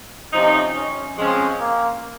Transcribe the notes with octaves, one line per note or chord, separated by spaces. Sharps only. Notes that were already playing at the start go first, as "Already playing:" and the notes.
C3 F3 C4 C#4 D#4
C#4
F3 G#3 C4 C#4
A#3